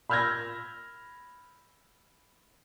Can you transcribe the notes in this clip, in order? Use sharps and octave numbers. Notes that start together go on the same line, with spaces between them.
B5 E6 F6 G6 G#6 A#6